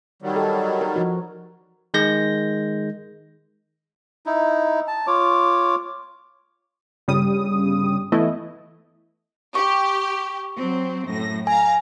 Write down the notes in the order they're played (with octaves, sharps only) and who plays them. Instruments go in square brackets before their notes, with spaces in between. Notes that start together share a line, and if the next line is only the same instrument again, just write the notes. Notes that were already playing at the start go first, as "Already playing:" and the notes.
[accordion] D#3 F#3 G3
[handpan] A4
A#4
F3 F#4
[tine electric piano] D#3 G#3 G6 A#6
[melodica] D#4 E4
A5
F4 C#5 D6
[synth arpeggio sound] G1 C#3 G3 D#6
E3 A3 B3 E4 A4 D#5
[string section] G4 [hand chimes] C#6
[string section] F#3 C4
F#2 A2 A#6
[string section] F5 A#5 [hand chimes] G#5